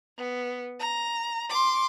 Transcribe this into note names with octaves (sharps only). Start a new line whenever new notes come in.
B3
A#5
C6 D6